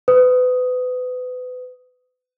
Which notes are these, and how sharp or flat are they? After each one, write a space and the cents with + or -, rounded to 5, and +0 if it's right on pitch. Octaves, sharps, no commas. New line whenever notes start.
B4 +30 D#6 +5